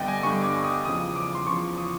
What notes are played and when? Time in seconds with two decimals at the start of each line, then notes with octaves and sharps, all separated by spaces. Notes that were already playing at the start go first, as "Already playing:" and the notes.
Already playing: G2 D3 G3 B3 D5 D#5 G5
0.08 G#5
0.23 G2 D3 G3 B3 C#6
0.43 D6
0.64 D#6
0.85 E2 C#3 F3 D#6
1.16 D6
1.35 C6
1.46 E2 C#3 F3 C#6
1.78 D#6